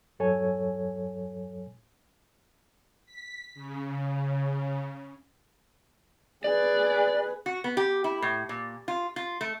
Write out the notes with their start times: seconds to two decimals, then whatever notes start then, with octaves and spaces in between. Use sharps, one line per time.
0.19 E2 G2 F#3 A4 C#5 G#5
3.05 B6
3.55 C#3
6.44 G#4 B4 D5
7.46 F#4
7.64 B3
7.77 G4
8.04 E4
8.22 A2
8.49 A#2
8.88 F4
9.16 F4
9.41 A3